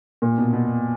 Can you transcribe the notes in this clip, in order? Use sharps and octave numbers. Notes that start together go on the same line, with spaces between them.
A#2
B2
B2